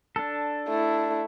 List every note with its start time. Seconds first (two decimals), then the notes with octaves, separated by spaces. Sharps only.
0.16 D4 A4
0.68 A3 E4